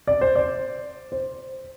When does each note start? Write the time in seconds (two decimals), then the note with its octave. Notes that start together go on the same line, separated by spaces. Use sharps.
0.07 D5
0.21 C5
0.35 D5
1.12 C5